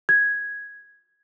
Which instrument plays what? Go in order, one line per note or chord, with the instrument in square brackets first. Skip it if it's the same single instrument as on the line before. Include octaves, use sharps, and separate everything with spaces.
[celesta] G#6